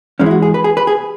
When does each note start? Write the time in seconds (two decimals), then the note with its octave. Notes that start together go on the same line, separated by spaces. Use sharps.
0.19 G#2 E3 G#3 C#4
0.26 E4
0.31 F#4
0.42 G#4
0.54 B4
0.64 G#4
0.77 B4
0.87 G#4